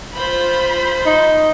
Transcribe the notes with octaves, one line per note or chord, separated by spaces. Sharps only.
F4 C5 B5
D#4